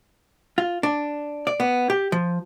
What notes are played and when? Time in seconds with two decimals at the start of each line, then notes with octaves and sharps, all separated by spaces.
0.58 F4
0.83 D4
1.47 D5
1.60 B3
1.90 G4
2.12 F3